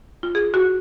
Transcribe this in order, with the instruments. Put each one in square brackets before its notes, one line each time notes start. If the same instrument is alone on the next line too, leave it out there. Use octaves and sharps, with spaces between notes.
[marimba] F4
G#4
F#4